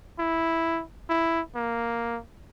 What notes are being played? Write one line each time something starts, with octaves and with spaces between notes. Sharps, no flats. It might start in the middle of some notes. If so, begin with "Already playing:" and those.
E4
E4
A#3